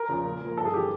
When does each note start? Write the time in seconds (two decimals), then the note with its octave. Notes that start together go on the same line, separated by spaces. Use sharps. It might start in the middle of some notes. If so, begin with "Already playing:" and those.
Already playing: A#4
0.09 E2 C#3 F3
0.24 A#2
0.41 F3 A#3
0.57 G1 A4
0.65 G#4
0.74 E3 G4